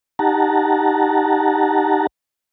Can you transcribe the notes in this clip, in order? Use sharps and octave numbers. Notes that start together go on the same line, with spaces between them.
D#4 G4 F#5 A5 A#5